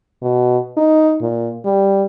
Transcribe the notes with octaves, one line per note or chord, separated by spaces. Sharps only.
B2
D#4
A#2
G3